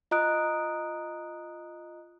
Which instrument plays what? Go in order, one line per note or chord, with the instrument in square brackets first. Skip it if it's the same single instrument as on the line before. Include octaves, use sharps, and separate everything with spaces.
[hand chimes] F4 D#5 A#5 D#6 F#6 D7